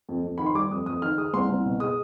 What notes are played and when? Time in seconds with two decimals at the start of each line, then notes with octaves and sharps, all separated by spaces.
0.09 F2
0.24 F2
0.38 D#3 B5
0.46 C6
0.54 G3 D6
0.70 F2 D#6
0.86 F2 D#6
1.02 D#3 F6
1.17 G#3 D#6
1.33 C2 C6
1.49 C2
1.65 B2
1.80 G#3 D#6